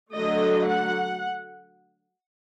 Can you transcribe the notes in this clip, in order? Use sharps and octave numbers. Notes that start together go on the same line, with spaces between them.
D3 F#3 A3 D#5
F#5